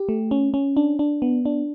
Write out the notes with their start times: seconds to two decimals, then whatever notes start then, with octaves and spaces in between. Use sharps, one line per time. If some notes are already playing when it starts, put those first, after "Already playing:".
Already playing: G4
0.09 A3
0.31 C#4
0.54 C#4
0.77 D4
0.99 D4
1.22 B3
1.45 D4